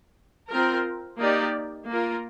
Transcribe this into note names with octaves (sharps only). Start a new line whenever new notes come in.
C4 F4 A#4
A#3 D#4 G4 D5
A#3 F4 A#4